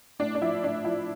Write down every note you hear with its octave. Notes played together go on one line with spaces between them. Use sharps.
A2 D4
D4
F3 E4
A2 D4
F3 E4